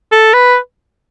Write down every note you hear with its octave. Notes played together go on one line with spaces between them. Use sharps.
A4
B4